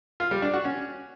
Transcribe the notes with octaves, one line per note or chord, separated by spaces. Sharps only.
F4
G3
D4
F#4
C#4